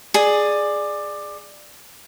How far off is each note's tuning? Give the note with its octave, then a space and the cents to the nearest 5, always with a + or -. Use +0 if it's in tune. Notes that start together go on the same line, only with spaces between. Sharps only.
G#4 +0 D5 +15